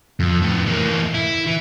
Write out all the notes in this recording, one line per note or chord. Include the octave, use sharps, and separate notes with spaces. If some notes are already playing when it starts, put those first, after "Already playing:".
F2
F2 A2
E3 A#3
E4
E3